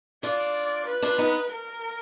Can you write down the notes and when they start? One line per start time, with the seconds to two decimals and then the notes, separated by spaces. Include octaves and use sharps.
0.23 D4 F4 D5
0.87 B4
1.02 D4 F4
1.18 B3 D#4
1.51 A#4